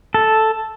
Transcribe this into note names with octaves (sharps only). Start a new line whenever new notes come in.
A4